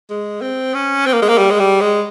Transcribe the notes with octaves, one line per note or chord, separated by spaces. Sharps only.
G#3
C4
C#4
C4
A#3
G#3
A#3
G3
G#3
G3
G#3